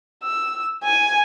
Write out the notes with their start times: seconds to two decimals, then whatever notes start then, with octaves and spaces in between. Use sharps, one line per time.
0.24 E6
0.84 G#5